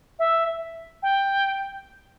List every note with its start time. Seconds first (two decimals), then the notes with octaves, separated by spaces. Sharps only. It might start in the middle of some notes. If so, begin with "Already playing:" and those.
0.19 E5
1.02 G5